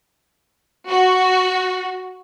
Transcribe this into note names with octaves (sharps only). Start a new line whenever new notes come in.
F#4